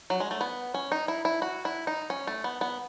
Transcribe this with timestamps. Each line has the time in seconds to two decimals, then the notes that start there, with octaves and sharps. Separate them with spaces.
0.10 F#3
0.20 G#3
0.31 A3
0.41 B3
0.74 C#4
0.92 D#4
1.08 E4
1.25 E4
1.42 F#4
1.65 E4
1.87 D#4
2.10 C#4
2.27 A3
2.44 B3
2.61 B3